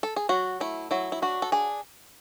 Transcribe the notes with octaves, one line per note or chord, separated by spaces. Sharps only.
A4
G#4
F#3 F#4
A3 E4
F#3 E4
E4
D4 F#4
A4
D4 G#4